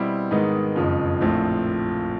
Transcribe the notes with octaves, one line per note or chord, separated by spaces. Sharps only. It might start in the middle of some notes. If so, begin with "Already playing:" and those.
Already playing: B2 G3 C4 E4
G#2 D#3 G#3 B3 D#4
F#1 F2 C#3 F3 G#3
A#1 A2 F3 A3 C4